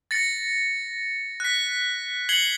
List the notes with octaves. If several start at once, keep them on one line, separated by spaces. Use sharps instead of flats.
A6 A#6 C#7
F#6 B6
G#6 C7 C#7 F#7 G7